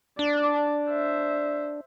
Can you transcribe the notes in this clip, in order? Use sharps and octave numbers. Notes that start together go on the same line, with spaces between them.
D4 D5
C5 E5